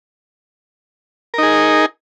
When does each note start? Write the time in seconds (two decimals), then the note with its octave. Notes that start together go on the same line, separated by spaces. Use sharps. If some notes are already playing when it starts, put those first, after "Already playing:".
1.34 A#4
1.38 D#4
1.43 G#4